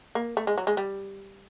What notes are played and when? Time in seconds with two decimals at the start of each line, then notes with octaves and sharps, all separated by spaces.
0.15 A#3
0.37 A3
0.47 G#3
0.58 F#3
0.67 G#3
0.77 G3